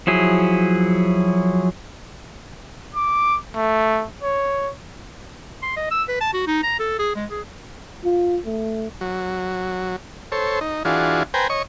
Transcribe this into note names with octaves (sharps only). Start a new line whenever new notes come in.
F3 F#3 E4 G#4
D6
A3
C#5
C6
D#5
E6
B4
A5
F#4
D#4
A#5
A4
G#4
G#3
G#4
F4
A3
F#3
A4 C5 C#5
D#4
E3 D4 F4 F#4 G#4
B4 C5 G5 G#5 A#5
C#5 D#5 C#6